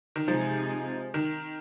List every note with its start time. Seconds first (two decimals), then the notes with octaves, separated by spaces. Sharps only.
0.16 D#3
0.27 C3 F3 G#3 D#4 G#4
1.14 D#3